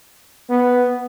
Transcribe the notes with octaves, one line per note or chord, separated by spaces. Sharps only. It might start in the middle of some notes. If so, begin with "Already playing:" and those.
B3